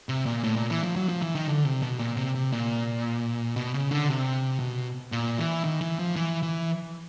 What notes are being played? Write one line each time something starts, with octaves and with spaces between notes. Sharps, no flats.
C3
A#2
A2
A#2
E3
F3
F#3
F3
E3
D#3
D3
C3
B2
A#2
C3
C3
A#2
B2
C#3
D3
C3
B2
A#2
E3
D#3
E3
F3
E3
E3